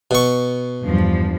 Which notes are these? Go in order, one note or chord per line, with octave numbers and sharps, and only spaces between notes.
B2 C#6
E2 G2 F3